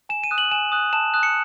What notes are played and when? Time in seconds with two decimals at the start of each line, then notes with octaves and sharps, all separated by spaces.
0.09 G#5 E7
0.24 D#7
0.31 D#6 F#6
0.38 F#7
0.51 G#5 E7
0.72 D#6 F#6
0.93 A5 E7
1.14 D#6 F#6
1.23 C#7